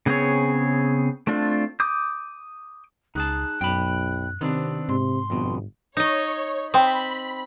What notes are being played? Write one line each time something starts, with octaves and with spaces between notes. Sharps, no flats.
C#3 B3 C4 G#4 C#5
A3 C4 D4 F4
D6 D#6 G6
C#2 D#4 G#4 A5 F#6
B1 F#2 G5 B5
C3 D#3 B3 C4 D4
G#2 C3 C6
G1 F2 B2
D#4 C#5 D#5
C4 G5 B5 C6 D#6